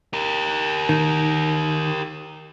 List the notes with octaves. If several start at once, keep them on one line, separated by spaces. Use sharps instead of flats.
G4 A#4
D#3